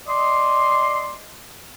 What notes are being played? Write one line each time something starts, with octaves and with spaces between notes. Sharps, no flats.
D5 D#5 C6